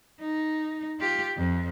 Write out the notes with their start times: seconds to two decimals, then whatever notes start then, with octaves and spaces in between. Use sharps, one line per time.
0.21 D#4
0.99 F4 G4
1.37 F2